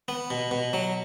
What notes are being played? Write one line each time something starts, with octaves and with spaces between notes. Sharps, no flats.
B3
B2
B2
F#3